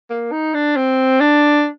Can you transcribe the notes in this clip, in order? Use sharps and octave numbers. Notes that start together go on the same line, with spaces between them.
A#3
D#4
D4
C4
D4